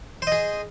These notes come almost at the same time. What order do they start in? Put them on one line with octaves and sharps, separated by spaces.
C5 D#5 G#4